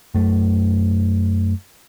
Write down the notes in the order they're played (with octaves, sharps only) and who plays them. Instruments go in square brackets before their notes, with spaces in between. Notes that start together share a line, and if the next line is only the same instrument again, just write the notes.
[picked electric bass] F#2 A3